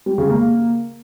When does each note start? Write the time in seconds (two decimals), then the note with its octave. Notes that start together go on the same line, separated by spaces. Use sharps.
0.06 G3
0.18 C#3
0.30 A#3